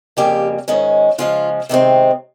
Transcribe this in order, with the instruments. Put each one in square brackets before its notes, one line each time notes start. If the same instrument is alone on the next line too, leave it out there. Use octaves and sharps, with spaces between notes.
[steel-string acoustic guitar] F2 C#3 G3 A#3 G4
G#2 D#3 G#3 C#4
C#3 F3 G#3 F4
C3 D#3 G#3 C4